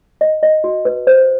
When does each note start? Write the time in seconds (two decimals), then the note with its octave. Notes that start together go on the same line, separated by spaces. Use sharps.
0.21 D#5
0.43 D#5
0.64 F#4
0.85 B4
1.07 C5